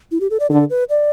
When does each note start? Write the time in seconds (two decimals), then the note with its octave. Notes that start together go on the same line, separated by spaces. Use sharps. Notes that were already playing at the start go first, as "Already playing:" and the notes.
0.11 E4
0.21 G4
0.30 A4
0.40 D5
0.50 D3 A4
0.70 B4
0.90 D5